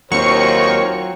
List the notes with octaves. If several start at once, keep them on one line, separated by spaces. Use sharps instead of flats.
D#2 F#3 C4 F4 A#4 C5 C#5 C#6